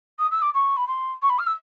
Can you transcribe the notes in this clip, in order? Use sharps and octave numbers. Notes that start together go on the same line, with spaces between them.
D#6
E6
D6
C#6
B5
C6
C#6
B5
F6
E6